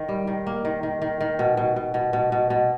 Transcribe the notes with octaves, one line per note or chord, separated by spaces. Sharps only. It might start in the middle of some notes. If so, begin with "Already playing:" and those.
Already playing: D#3
G3
D#3
A#3
D#3
D#3
D#3
D#3
B2
B2
B2
B2
B2
B2
B2